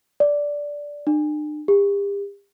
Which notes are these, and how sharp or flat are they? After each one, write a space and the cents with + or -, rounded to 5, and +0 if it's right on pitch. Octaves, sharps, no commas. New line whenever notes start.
D5 -10
D4 +45
G4 +40